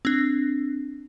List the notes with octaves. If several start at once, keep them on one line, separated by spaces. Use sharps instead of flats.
C4 D4